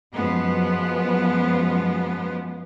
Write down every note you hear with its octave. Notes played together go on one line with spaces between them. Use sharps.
F#2 F3 G#3 B3